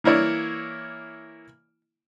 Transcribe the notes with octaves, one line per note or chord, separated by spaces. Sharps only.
E3 A#3 E4 C#5 D5